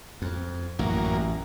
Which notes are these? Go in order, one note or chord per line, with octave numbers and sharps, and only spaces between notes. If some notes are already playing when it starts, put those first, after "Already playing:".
F2
A1 F#2 A#3